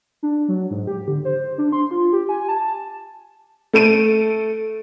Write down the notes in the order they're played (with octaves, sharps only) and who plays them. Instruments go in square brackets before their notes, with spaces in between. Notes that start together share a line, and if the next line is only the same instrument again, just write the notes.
[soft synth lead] D4
F#3
G#2
G4
D3
C5
D4
C6
F4
G4
G#5
A5
[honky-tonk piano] A3 A4 D7 D#7